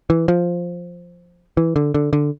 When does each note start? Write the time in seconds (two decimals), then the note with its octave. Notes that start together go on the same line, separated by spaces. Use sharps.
0.10 E3
0.28 F3
1.57 E3
1.76 D3
1.94 D3
2.13 D3